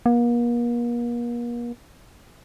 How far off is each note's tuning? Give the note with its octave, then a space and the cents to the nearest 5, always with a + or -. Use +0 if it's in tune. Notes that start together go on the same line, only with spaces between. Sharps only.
A#3 +40